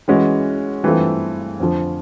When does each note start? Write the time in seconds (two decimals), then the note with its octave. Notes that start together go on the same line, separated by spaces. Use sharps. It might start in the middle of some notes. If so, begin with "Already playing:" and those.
0.08 E3 G#3 C#4 F#4
0.84 G2 E3 A3 C4 F4
1.60 F2 D3 F3